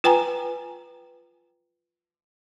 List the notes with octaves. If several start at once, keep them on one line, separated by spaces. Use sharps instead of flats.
F4 B4 G5 G#5 A#5